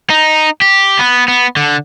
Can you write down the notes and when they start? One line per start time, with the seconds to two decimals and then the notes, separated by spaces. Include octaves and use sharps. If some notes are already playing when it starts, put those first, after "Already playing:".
0.10 D#4
0.62 G4
0.99 B3
1.28 B3
1.57 D3